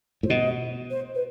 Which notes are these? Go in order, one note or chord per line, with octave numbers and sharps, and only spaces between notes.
A2 C5
B2 D#5
C5
B4